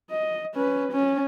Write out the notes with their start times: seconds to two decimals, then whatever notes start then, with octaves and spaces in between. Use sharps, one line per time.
0.10 D#5
0.55 C#4 B4
0.92 C#4